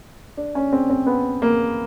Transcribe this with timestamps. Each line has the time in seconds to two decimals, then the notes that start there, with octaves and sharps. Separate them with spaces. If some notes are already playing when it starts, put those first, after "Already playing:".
0.37 D4
0.55 C#4
0.73 C4
0.90 C4
1.06 B3
1.42 A#3